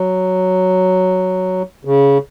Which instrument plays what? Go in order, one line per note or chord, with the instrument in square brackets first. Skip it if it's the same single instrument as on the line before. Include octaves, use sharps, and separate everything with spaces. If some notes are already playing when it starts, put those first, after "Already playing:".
Already playing: [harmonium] F#3
C#3